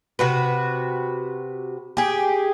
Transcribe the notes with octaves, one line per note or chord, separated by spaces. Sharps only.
C3 F#4 B4
G4 G#4